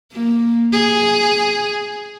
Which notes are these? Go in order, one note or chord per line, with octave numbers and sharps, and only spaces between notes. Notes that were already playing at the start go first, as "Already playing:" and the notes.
A#3
G#4